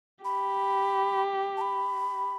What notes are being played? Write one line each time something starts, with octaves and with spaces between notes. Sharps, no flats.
G4 B5
A5
B5